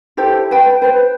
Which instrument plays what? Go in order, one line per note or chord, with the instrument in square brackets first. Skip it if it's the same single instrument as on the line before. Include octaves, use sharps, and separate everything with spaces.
[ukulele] E4 G4 A4 C5
B4 G5
B4 C5